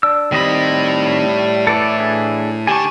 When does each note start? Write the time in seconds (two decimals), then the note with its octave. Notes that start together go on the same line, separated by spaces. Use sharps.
0.03 D4 E6
0.32 A2 D#3 G3 C4 D#5 B5
1.67 E3 A4 D5 A5
2.00 D4 G#4 A4
2.67 D3 G4 G#5 A5 C#6